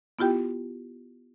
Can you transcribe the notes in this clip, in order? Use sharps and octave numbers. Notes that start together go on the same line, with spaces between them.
B3 E4 F4 G4 G5